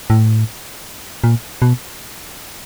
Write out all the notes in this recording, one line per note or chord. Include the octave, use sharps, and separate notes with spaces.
A2
A#2
B2